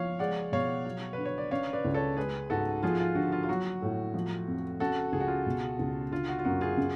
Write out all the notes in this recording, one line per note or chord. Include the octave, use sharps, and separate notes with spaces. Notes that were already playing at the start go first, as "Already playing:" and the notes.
Already playing: F3 C#5 F5
G#3 D5 F#5
B2 C#5 F5
F#3
D3 B4
C#5
D5
C#3 C#5 F5
B4 D5
C#2
A4 C#5
G#3 G#4 B4
G#2 F#4 A4
F3 F4 G#4
F4
D3 F#4
F4
F4
F#3 F#4
A2
F3
F2
C#3 F#4 A4
C#2 G#4
F#4
F4 G#4
B2
C#2
D3 F4
F#4
F4
F#2 F#4
F4 G#4
C#3